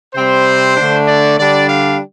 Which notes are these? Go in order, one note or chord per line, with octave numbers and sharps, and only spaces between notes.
C3 G3 C4 C5
D3 A3 D4
D5
D3 G3 D4 D5
F5